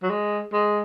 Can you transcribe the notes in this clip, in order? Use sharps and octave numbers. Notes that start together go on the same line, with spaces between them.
F#3
G#3
G#3